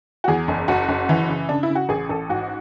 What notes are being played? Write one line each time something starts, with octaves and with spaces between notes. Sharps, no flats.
F#4
E2 G#4
F#1
F#1 F#4
F#1
E3
C#3
C#3 D4
E4
C#3
F#4
A1 G#4
A1 A4
G#2 F#4